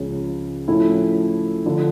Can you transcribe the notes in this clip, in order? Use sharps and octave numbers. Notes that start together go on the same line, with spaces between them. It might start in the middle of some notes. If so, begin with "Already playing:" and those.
Already playing: C#2 C#3 F3
A2 F3 A3 C#4 E4
D3 F3